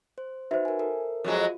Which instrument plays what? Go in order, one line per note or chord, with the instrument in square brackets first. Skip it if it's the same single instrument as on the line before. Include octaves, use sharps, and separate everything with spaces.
[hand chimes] C5
[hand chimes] D#4 F#4 B4 [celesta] C5 E5
[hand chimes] A#4 G#5
A4 A#4
[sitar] F2 F#3 G#3 [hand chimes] F4 F#4